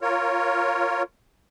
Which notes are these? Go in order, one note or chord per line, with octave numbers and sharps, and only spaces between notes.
F4 A#4 C#5